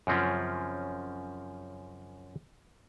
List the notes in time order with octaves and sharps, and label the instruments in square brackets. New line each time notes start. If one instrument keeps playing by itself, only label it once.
[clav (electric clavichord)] F#2 C#3 F3 C4 C#4 F4